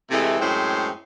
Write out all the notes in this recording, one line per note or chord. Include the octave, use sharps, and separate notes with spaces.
C3 E3 G#3 A3
F#2 A2 G#3 C4 C5